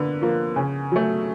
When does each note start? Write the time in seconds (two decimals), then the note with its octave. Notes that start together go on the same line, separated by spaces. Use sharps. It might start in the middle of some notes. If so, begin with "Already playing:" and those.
Already playing: D3 A#3 B4
0.21 F3 A#3
0.56 C#3
0.92 F#3 A3